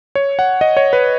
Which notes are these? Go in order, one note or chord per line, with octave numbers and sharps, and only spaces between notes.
C#5
F#5
D#5
C#5
B4